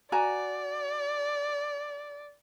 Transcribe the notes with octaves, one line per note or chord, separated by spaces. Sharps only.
F#4 D5 G#5 A#5